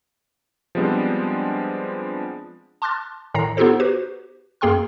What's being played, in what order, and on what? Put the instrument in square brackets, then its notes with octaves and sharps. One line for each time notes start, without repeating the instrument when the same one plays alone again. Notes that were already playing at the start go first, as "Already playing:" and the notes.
[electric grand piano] F3 G3 G#3 B3 C4 D4
[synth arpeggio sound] A5 C6 D6 F6 F#6 A6
A2 D#3 A#5 A#6 C7
B3 D#4 F4 G4 A4 C5
F#4 G4 B4 C5
F#2 A#3 G#4 G5 C6 F6